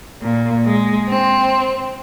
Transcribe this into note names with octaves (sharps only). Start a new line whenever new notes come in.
A#2
G#3
C4